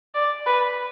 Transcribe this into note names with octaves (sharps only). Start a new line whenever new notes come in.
D5
B4